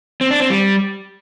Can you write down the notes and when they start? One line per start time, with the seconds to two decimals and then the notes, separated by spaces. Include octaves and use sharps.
0.21 C4
0.31 D4
0.40 C4
0.50 G3